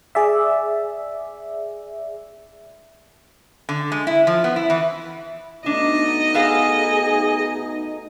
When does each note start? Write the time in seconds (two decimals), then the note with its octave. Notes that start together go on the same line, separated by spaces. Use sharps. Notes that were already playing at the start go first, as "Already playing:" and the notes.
0.15 G#4 D5 E5
3.69 D3
3.92 G#3
4.07 E4
4.27 F3
4.44 B3
4.56 E4
4.70 E3
5.66 B2 A3 D4 D#4 D#5
6.34 B3 G#4 A4 F5